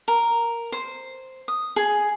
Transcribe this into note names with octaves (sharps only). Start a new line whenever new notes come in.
A#4
C5
D#6
G#4